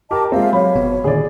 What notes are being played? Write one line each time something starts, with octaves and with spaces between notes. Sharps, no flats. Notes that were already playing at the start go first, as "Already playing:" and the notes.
G4 A#4 D#5 A5 D6
G#3 C4 F4 E5 F5
F#3 C#5 B5
G1 B2 B3
A#2 D3 D#3 G#4 D5